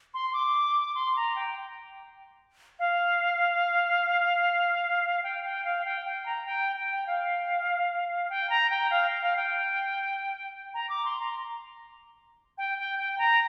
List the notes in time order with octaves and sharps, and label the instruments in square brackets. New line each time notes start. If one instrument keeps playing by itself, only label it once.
[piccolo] C6
D6
C6
A#5
G5
F5
G5
G5
F5
G5
G5
A#5
G5
G5
F5
G5
A#5
G5
F5
F5
G5
A#5
D6
C6
A#5
G5
G5
G5
A#5